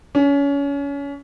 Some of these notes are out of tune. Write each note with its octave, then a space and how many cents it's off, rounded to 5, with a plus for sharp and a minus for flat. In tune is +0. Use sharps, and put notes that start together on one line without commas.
C#4 +30